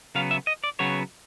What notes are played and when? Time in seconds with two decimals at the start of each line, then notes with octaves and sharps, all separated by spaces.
0.15 C#3 F#3 B3 F5
0.31 E5
0.47 D#5
0.64 D5
0.79 C#3 F#3 B3 C#5